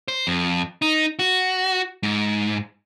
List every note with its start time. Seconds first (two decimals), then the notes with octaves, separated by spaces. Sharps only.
0.08 C5
0.27 F2
0.82 D#4
1.19 F#4
2.03 G#2